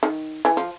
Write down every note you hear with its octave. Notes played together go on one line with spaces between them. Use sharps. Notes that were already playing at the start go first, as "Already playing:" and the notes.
D#3
E3
F3